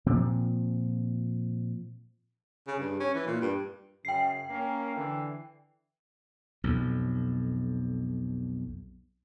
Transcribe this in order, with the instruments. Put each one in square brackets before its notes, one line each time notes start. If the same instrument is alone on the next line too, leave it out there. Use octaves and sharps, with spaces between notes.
[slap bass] A#2 F3 C4
[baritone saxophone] C#3
G2
C#4
E3
A#2
G2
[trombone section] F#2 C#3 [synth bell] G5 C7
[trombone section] A#3 C#4 A#4
D3 E3
[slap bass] B1 F2